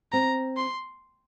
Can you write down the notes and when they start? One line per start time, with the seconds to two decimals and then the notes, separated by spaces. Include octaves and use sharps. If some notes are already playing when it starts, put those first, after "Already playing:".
0.12 C4 A#5
0.57 C6